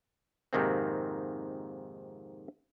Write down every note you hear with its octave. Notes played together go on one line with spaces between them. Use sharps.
F2 G#2 C3 D#3 A#3 C4